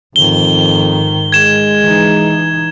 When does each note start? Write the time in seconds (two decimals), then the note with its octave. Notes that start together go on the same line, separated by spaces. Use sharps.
0.16 F2 G#2 D#3 G7
1.32 G#3 G#6 E7
1.82 E3 D#4